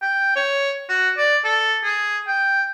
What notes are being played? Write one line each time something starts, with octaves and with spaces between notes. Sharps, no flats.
G5
C#5
F#4
D5
A4
G#4
G5